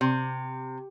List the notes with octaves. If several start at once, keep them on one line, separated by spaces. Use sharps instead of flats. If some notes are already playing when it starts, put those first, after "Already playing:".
C3